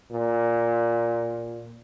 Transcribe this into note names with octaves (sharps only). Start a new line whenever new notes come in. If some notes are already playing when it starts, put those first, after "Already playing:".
A#2